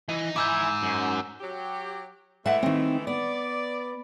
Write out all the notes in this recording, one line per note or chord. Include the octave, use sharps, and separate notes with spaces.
E3 D#4 D#5
G#2 E4 G#5 D6 E6 G6
F#2
F#3 G4
E3 G#3 A3 E5 F#5 A5
D#3 C4
B3 D5